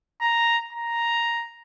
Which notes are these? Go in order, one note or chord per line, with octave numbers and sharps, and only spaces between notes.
A#5
A#5